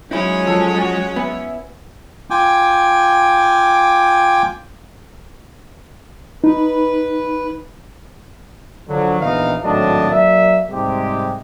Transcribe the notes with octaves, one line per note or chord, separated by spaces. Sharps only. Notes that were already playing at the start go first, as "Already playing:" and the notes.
F#3 G#3 C#4 D#4 E4 C#5
F3 A4
F#4
B3 E4
F4 G5 G#5 D6
D#4 B4
D3 F3 F#3
A#1 E3 B3 D#4 D#5 F5
G#1 A2 F#3 D4 D#5 A5
F#3 A#3 D5 E5
G#2 C3 G3 G#3 G4